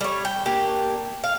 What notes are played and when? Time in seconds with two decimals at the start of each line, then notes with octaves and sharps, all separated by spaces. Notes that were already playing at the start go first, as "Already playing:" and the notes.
0.01 G3 C#5
0.25 G5
0.46 A#3 D4 G4
1.24 F5